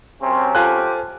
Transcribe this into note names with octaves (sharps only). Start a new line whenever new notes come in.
F#2 C3 C4 C#4
F4 G4 A4 C5 G#5 A5 F#6